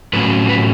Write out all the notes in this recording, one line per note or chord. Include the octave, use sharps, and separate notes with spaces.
A2 F#3 C#4 B4
B4